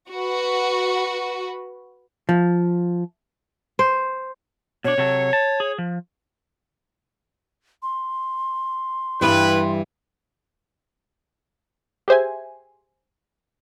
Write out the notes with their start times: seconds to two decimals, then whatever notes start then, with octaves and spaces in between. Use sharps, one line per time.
0.12 F#4 B4
2.29 F3
3.79 C5
4.84 B2 D4 C#5
4.98 C3 F#3 A4
5.33 A5
5.60 G#4
5.78 F3
7.83 C6
9.21 G2 E3 G3 E4 B4
12.08 G4 G#4 C5 E5 G#5